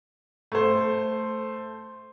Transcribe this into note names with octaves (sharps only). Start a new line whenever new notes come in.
A3 C5